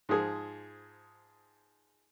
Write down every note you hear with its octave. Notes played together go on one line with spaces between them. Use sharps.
G#2 F3 G#4